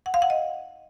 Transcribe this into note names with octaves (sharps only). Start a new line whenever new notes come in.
F#5
F5
F#5
D#5